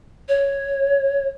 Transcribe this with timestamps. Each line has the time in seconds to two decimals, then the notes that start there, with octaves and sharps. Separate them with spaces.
0.29 C#5